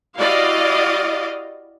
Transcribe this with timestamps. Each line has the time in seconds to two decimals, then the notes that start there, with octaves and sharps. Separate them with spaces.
0.16 E4 F#4 G4 D5 D#5 F5